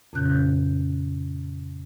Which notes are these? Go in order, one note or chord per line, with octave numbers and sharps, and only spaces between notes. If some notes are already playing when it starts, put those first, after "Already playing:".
F2 A#2 C#3 C#4 F#6 G6